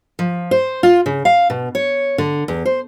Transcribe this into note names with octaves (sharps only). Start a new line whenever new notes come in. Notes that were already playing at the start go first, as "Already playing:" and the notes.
F3
C5
F4
C#3
F5
B2
C#5
D3
E2
C5